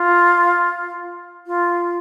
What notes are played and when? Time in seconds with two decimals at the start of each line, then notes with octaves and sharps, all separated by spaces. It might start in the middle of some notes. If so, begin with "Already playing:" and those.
Already playing: F4
1.47 F4